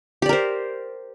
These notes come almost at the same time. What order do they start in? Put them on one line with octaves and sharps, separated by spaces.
G4 D5 A#4 C5